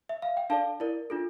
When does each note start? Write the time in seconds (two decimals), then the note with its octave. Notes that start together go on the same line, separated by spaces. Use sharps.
0.09 E5
0.22 F5
0.37 G5
0.50 D4 A4 D5 F5 A5
0.80 E4 A#4 D5
1.10 D4 F4 A4